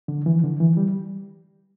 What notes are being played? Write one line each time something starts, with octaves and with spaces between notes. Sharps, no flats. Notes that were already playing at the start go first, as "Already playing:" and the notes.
D3
E3
D3
E3
G3